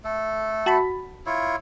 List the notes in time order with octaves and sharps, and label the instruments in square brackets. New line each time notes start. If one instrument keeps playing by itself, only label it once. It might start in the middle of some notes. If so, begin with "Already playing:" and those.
[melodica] A3 A4
[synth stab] F#4 A5 B5
[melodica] E4 F4 C#5